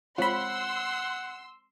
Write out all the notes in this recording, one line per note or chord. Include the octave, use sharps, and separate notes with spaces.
G#3 C4 F4 C#5 F#5 B5 C6 E6